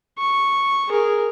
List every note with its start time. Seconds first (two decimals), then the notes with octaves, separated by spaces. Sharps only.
0.18 C#6
0.88 G#4 A#4